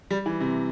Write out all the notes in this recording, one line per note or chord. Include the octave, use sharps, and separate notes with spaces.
G3
E3
C3